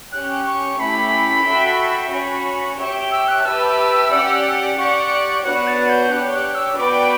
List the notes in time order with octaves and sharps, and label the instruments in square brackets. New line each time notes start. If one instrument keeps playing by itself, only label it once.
[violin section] C#4 G4 C#5 [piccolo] F#6
[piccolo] C#6
[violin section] A3 C#4 E4 G4 [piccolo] B5
[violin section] F#4 A4 E5 G5
[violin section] C#4 F#4 C#5 [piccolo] B5
[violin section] G4 C#5 E5 G5 [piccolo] C#6
[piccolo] E6
F#6
[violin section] G4 B4 E5 A5 [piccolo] E6
[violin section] C#4 G4 D5 F#5
[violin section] G4 D5 F#5 [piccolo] C#6
[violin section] B3 D4 F#4 C#5 F#5 [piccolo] F#6
[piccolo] A6
G6
[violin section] D4 G4 C#5 [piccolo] F#6
[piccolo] F#6
E6
[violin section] B3 F#4 B4 D5 G5 [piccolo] D6